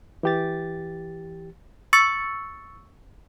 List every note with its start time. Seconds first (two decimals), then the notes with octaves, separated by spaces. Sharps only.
0.23 E3 G4 A6
1.93 C#6 E6 A6 C#7